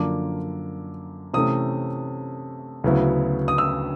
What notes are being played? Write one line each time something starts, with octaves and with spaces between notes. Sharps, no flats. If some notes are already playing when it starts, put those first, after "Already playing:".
Already playing: F#2 D3 F3 A#3 D4 D6
C3 E3 A3 C#4 D#6
D2 C#3 F#3 B3 E4
D#6
E6